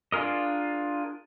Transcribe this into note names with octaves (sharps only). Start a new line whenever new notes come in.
D4 F4 G#4 A#4 D#5